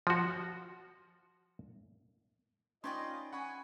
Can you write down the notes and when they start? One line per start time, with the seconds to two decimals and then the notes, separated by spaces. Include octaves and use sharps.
0.07 F3 F#4
2.84 C#4 D#4 F4 B4 D5 D#5 G5 C6
3.33 F#5 G#5 B5 C#6